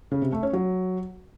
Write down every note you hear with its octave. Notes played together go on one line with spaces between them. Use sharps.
C#3
C3
A3
C#4
F#3